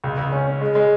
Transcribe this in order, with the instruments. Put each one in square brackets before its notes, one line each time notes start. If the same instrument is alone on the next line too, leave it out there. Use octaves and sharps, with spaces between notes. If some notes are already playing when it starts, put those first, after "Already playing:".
[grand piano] C#2
C#2
C#4
C#4
G#3
G#3